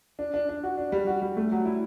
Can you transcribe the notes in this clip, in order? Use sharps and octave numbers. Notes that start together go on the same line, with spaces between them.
D4
D4
D4
F#4
D4
G3
F#4
G3
A3
F#3
E4